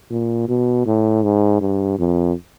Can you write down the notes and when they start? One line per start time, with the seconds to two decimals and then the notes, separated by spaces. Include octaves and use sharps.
0.10 A#2
0.48 B2
0.86 A2
1.23 G#2
1.61 G2
1.99 F2